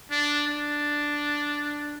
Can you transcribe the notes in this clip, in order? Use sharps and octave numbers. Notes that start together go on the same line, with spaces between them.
D4
D4